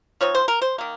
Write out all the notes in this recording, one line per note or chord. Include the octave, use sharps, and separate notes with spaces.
F3 C4 D#4 C#5
C5
A#4
C5
D#3 A#3